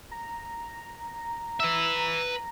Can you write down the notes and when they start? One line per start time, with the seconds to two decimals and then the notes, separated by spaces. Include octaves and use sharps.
0.11 A#5
1.60 B4 E5